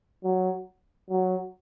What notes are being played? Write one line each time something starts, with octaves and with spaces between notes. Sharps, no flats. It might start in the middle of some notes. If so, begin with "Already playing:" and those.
F#3
F#3